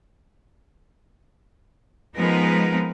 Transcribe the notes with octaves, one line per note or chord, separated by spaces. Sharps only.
F3 G#3 B3 D#4 A#4 B4